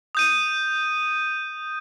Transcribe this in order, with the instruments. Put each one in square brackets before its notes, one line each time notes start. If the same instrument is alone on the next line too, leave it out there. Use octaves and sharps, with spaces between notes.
[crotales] D#6 G6 D#7